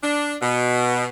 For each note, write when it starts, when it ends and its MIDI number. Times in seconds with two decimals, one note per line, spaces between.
0.02 0.35 62
0.42 1.08 47